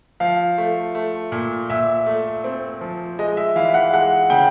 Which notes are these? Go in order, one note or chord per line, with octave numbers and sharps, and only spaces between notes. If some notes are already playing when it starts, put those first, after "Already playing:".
F3 F5
A3
A3
A#2
A#2 E5
A3
C4
F3
G#3 D#5
E5
E3 F5
F#5
G#3 F#5
C#3 G5